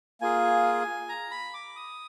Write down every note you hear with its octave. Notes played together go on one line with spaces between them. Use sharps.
A#3 F4 G#4 G#5
A#5
B5
D6
D#6